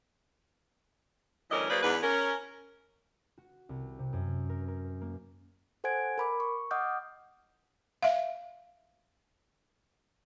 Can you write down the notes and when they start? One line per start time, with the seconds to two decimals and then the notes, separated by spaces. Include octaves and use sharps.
1.50 D2 E3 G3 C#4 A#4 D#5
1.70 F#3 A#3 G#4 B4 C5 D5
1.82 E2 G#2 D4 B4
2.03 C#4 A#4
3.38 F#4
3.69 C2
3.99 C3
4.13 F#2
4.49 A#4
4.68 A#4
5.01 A#3
5.84 A4 C5 F#5 G#5 G#6 D7
6.18 A#4 B5 D6
6.40 C#6
6.71 D#5 F#5 D6 D#6 F6 G6
8.03 E5 F5